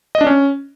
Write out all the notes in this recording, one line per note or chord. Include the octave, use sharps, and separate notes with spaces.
D#5
D4
C#4